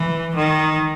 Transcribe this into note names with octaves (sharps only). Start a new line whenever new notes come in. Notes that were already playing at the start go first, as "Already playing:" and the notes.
Already playing: E3
D#3